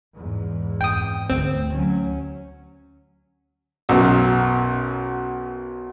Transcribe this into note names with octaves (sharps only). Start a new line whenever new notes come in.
E2 G#2
F2 G5 D#6
D2 A3 C4
D2 F#3 C#4
B1 F#2